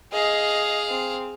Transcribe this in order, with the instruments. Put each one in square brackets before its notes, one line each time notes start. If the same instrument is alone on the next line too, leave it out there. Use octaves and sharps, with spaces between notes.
[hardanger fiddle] G#4 F5 [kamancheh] D#5
[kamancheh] C4